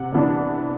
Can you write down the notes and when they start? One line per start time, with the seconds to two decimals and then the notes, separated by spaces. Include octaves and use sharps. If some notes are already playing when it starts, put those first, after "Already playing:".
Already playing: C3 F#5
0.12 C3 E3 B3 D4